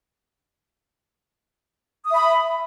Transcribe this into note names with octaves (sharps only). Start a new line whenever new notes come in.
E5 B5 D#6